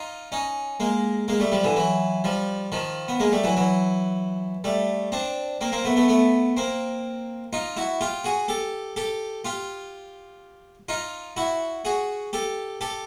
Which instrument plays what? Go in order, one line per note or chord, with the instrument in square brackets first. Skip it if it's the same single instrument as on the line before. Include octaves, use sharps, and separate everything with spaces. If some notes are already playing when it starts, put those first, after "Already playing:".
Already playing: [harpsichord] D#4 F4
C#4 D#4
G#3 A#3
G#3 A#3
G3 A3
F3 G3
D3 E3
E3 F#3
F3 G3
D#3 F3
B3
G#3 A#3
G3 A3
E3 F#3
E3 F#3
G3 A3
C4 D4
A#3 C4
A#3 C4
A3 B3
A3 B3
A3 B3
A#3 C4
D#4 F4
E4 F#4
F4 G4
F#4 G#4
G4 A4
G4 A4
F4 G4
D#4 F4
E4 F#4
F#4 G#4
G4 A4
G4 A4